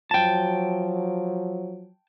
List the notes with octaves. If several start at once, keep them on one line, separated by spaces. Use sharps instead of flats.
F3 F#3 G5 A5